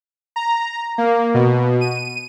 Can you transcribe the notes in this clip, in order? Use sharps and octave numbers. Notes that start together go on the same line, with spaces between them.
A#5
A#3
B2
D#7